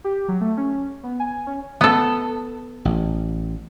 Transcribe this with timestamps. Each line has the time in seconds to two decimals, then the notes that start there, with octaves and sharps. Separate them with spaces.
0.04 G4
0.28 F#3
0.41 A3
0.57 C#4
1.04 B3
1.20 G#5
1.47 C#4
1.81 B3 A4
2.85 A1